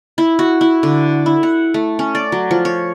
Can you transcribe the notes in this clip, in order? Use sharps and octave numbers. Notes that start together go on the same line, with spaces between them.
E4
F#4
E4
D3
E4
F#5
A3
C#4
D5
F#3
F3
C#5